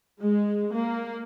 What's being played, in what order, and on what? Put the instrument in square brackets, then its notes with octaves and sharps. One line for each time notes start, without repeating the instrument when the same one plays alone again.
[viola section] G#3
A#3